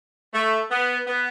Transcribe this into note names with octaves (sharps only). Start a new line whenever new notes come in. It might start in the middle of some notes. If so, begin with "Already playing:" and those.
A3
B3
B3